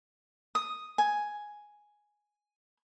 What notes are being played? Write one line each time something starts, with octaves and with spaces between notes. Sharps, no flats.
D#6
G#5